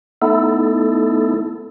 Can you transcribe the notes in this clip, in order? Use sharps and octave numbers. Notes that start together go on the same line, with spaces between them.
A3 B3 D#4 E4 A4